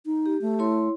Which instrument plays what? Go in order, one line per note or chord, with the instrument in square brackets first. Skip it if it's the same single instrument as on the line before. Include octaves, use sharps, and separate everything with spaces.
[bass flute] D#4
[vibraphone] G4
[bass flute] A3
[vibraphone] E4 C#5 C6